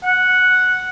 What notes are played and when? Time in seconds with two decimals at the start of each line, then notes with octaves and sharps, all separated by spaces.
0.04 F#5